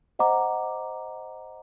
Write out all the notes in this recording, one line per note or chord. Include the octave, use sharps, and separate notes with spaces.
C5 D#5 F#5 A#5 D6